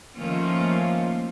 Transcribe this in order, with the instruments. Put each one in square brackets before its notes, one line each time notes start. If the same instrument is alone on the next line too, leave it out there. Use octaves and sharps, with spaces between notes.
[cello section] D#3 F3 A3 A#3 C#4 F4